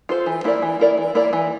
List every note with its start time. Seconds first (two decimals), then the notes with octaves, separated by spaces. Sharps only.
0.09 F4 A4 C5
0.26 E3
0.44 A#3 E4 A#4 D5
0.62 E3
0.80 A#3 E4 A#4 D5
0.97 E3
1.15 A#3 E4 A#4 D5
1.33 E3